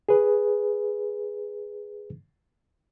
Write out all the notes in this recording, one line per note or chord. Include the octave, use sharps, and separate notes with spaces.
G#4 B4